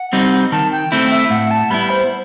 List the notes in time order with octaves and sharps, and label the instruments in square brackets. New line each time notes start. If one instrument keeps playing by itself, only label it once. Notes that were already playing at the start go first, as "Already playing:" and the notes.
Already playing: [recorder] F#5
[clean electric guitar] G3 C4 D#4
[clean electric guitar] D#3 [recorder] A5
[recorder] G5
[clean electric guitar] A3 C4 E4
[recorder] E5
[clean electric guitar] A2 [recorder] F#5
[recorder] A5
[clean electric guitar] G3 B3 E4 [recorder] B5
[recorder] C5